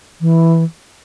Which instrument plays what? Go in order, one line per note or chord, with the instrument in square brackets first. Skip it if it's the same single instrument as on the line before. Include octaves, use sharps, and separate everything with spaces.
[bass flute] E3